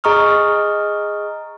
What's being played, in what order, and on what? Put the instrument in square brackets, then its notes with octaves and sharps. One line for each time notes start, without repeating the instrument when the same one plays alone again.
[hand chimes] G#4 D#5 A#5 C#6 D#6 F6